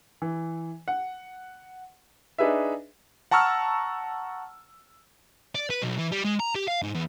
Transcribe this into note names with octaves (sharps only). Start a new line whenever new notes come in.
E3
F#5
D4 D#4 G#4 B4 E5
F#5 A5 A#5 C#6 E6 F6
D5
B4
B1
E3
G3
G#3
A#5
G4
F5
G#2
E2